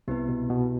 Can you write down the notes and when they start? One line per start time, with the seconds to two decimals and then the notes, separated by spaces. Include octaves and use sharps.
0.08 C2 C3 B3 E4 G4 B4
0.29 B2
0.50 B2